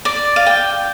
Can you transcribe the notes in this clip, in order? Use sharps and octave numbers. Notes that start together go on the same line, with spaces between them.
D5
F5
G5